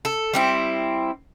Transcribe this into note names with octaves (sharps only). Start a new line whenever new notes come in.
A4
G3 C4 E4